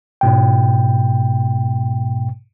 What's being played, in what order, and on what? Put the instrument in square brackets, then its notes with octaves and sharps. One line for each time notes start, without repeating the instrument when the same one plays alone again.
[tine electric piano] G#2 B2 G5